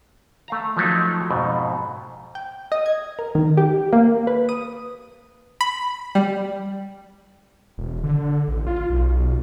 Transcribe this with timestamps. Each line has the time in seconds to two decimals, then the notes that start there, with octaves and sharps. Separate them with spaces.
0.48 A3 F5 A#5
0.77 F3 F#3 A3 D#4
1.31 F2 G#2 B2
2.35 G5
2.72 D#5
2.86 G#6
3.19 A#4
3.35 D#3
3.57 G4
3.93 A#3
4.27 B4
4.49 D#6
5.61 B5
6.15 G3
7.78 E1
8.03 D3
8.48 A1
8.67 F4
8.90 B1